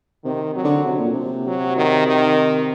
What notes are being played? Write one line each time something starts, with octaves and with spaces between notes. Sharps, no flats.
C3 D#3
F#3
D3
C3
A#2
C3
F#3
D#3
D#3